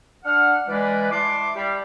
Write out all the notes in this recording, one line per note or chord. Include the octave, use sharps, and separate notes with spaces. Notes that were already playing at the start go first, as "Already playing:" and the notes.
D4 F#5 F6
E3 G#3 B4 D5
E4 D5 A5 C6 D6
G3